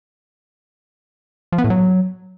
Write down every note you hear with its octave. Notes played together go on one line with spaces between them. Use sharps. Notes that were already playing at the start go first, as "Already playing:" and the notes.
F3
B3
A2
F#3